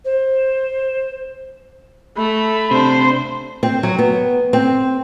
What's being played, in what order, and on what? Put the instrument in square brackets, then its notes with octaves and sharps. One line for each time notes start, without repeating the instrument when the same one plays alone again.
[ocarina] C5
[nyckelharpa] A3 [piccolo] B5
[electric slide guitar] C3 D4 [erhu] C5
[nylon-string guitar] C4
F#3
B3
C4